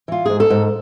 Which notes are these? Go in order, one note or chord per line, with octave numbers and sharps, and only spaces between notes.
E3 F4
G#2 G#4
A4
G#2